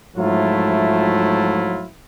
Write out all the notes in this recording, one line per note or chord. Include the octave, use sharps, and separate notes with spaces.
G#2 F3 F#3 A3 E4 F4